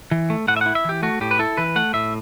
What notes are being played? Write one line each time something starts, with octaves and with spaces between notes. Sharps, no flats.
E3
A3
A2 F#5
E5
E4 F#5
E5
E3 G4
A3 F#4
A2 G4
B4
E4 A4
E3 B4
A3 F#5
A2 E5